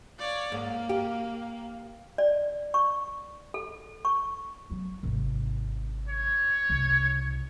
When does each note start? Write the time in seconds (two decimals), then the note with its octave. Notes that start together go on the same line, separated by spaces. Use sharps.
0.18 C#5 D5 F5
0.52 G#2 A#3 C#4
0.89 G4
2.18 D5
2.74 C#6
3.54 A4
4.05 C#6
4.70 F#3 B3
5.03 G#1 C3
6.09 C#5
6.69 F#1 C2